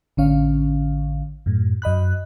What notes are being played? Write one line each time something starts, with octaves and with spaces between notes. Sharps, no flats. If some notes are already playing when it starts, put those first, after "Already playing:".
A1 D3 C#4 F5
F#2 A2
F#2 D#5 B5 F#6